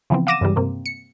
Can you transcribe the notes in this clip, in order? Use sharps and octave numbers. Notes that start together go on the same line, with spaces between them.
C#3 E3 F3 B3 C4
F5 F#5 D6 A#6 D#7 E7
G2 C#3 E3 G3 G#3
G2 C3 A#3 C4
C#7